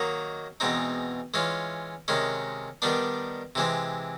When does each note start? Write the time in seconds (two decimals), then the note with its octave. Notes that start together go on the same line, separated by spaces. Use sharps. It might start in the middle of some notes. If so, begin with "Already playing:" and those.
Already playing: D#3 F#3 A#3 D#4
0.60 E2 B2 G#3 C4 D#4
1.34 E3 G#3 C#4 F4
2.08 C3 D#3 G#3 C#4
2.82 D#3 G3 B3 D4
3.55 C3 E3 G#3 C4